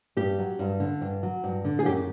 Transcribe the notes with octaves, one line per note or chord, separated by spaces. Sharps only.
G2 G4
F#3
G2
D3
G2
F#3
G2
D3
G#4
F#2 G4